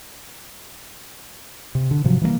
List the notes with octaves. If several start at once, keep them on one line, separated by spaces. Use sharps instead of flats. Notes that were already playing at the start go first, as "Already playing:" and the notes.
C3
D3
G#2 C3 F3 F#3
E3 G3 G#3 A#3